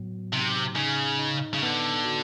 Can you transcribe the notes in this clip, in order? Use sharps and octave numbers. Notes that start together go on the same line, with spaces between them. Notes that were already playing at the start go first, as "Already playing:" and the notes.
Already playing: A2 F#3 B3
C3 D#4
C#3 D#4
D#4
C#3
D3 B3
F#4